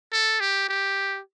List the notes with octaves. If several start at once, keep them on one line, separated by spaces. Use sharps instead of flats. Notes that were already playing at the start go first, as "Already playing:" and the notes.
A4
G4
G4